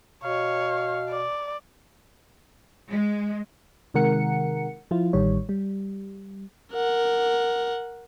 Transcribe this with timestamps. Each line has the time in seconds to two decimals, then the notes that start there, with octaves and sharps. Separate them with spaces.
0.24 B2 C#5 F5
1.09 D5
2.90 G#3
3.94 C3 D#3 G#3 A#4 F#5 C#7
4.91 F3 E4 F4
5.13 A1 D#3 G3 C#5
5.49 G3
6.72 A#4 F#5